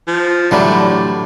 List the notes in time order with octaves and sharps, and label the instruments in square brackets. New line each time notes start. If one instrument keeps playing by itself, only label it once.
[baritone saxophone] F3
[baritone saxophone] A2 [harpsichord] D3 E3 G3 [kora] F#3 D4